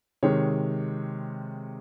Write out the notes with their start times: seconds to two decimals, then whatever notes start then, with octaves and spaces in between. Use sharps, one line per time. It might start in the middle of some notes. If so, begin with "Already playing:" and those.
0.23 C3 D#3 G#3 C#5